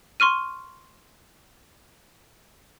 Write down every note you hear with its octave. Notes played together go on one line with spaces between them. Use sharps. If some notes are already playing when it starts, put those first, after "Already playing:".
C6 C#6 F6 D#7